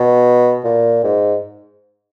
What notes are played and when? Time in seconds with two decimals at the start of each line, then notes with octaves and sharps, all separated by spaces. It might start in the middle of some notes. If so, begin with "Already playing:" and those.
Already playing: B2
0.64 A#2
1.04 G#2